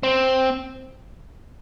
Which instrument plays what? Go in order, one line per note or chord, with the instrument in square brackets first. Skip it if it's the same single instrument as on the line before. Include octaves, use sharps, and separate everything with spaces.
[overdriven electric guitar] C4